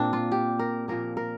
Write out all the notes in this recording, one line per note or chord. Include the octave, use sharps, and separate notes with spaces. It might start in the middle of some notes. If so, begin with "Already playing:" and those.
Already playing: A#2 A#3 C4 D4
F4
G4
A#4
A#2 F3 A#3 A#4
A#4